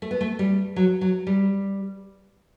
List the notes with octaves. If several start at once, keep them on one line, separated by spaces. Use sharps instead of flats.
A3
B3
A3
G3
F#3
F#3
G3